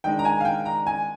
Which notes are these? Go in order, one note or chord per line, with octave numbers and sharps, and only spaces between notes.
D#3 G#3 D4 G5
A#5
G#5
F5
G5
A#5
G#5